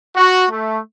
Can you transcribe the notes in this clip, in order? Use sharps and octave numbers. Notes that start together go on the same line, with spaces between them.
F#4
A3